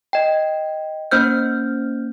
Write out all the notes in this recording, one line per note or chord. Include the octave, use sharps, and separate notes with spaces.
D#5 G5
A#3 C#4 C5 F6 G6